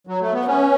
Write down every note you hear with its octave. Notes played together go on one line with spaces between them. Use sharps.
F#3
A3
B3
C#5
C#4 B4